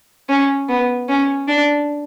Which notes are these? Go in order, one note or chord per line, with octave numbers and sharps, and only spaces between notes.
C#4
B3
C#4
D4